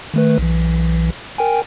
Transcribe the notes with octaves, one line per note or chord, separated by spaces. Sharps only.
D#3 A3 B4
B1 E3
A#4 G5 G#5